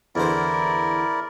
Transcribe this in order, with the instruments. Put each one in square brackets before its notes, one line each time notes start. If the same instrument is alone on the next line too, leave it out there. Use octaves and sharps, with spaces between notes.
[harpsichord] E2 D3 C5 [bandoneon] E4 A#4 D5